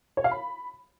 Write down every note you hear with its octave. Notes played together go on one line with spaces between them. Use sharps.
C#5
F5
B5